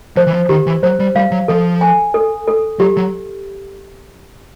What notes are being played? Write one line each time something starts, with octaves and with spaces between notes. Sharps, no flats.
F3 C5
E3
F3
D#3 G4
E3
F#3 C5
G3
G3 F5
F#3
F3 A4
G#5
A4
A4
F#3 G4
F#3